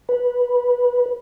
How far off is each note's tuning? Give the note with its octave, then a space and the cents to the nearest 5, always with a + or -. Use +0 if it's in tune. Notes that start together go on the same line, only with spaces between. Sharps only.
B4 -15